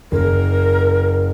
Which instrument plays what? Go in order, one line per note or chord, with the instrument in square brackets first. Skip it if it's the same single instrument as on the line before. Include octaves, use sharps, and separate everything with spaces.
[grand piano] F#1 [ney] A#4